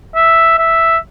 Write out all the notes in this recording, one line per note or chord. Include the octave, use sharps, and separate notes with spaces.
E5
E5